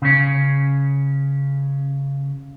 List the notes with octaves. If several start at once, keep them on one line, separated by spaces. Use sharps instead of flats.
C#3 C#4